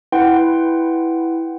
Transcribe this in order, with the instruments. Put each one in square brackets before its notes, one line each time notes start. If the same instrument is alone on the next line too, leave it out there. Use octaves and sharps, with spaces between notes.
[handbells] E4 B4 F#5 G5 C6